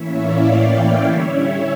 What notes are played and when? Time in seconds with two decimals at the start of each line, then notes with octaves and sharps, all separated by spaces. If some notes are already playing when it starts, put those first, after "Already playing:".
Already playing: A2 E3 A#3 C#4 E4 C#5 E5
0.19 D5 F5
0.48 E5 G5
0.77 C#5 E5
1.05 D3 G3 C#4 E4